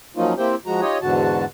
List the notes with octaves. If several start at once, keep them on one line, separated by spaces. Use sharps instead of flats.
F3 F#3 A#3 C#4 D#4 F4
A#3 C4 E4 G4 C5 G5
F3 G#3 F#4 A#5
D#4 F4 G4 C#5 D#5
E2 G#2 D3 F#4 A5